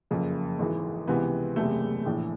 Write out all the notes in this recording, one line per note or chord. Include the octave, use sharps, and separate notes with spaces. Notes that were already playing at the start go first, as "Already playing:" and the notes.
F#1 F2 C#3
G#1 G#2 E3
C#2 C3 E3 B3
F#1 E2 C3 A3
A#1 A2 E3